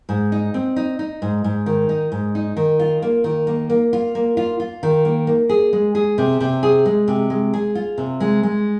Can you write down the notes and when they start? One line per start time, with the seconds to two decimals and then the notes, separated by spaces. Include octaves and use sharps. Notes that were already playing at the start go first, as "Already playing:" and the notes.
0.09 G#2
0.32 D#4
0.54 C4
0.76 D#4
0.99 D#4
1.22 G#2
1.44 G#2
1.66 D#3
1.89 D#4
2.12 G#2
2.35 D#4
2.57 D#3
2.79 F4
3.02 A#3
3.24 D#3
3.47 A#3
3.70 A#3
3.93 F4
4.15 A#3
4.37 F4
4.60 F4
4.83 D#3
5.05 A#3
5.27 A#3
5.49 G#4
5.73 G#3
5.95 G#4
6.18 C3
6.40 C3
6.63 G#4
6.86 G#3
7.08 C3
7.30 G#3
7.53 G#4
7.75 F4
7.98 C3
8.20 G#3
8.43 G#3